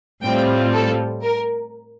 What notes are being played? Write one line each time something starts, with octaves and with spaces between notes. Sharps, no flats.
A2 G3 C4 F4 G5
A4
A#4